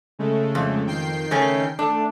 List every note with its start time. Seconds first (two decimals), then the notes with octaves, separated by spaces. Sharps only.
0.19 C#3 G#3 A3
0.55 F2
0.87 D#3 G5 C7
1.31 C#3 A3 C#4
1.79 A3 D4